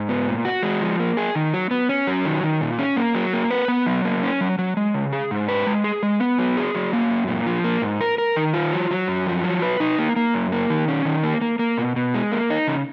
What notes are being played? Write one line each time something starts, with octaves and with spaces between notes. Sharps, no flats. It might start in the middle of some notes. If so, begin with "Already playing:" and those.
Already playing: G#2
B3
A#2
F#4
G#3
F3
A#3
G#4
D#3
F#3
B3
C#4
F#3
D#3
D#3
A#2
C#4
A#3
F#3
A#3
B4
B3
F#3
A#3
C#4
F#3
F#3
G#3
C#3
G#4
G#2
B4
G#3
G#4
G#3
B3
F#3
G#4
F#3
A#3
F#2
A#2
F3
A#3
G#2
A#4
A#4
D#3
F4
F#3
F#3
F#2
F3
F#3
B4
D#4
A#3
A#3
F#2
A#3
D#3
C#4
D#3
A#3
A#3
A#3
B2
B2
G#3
A#3
D#4
C#3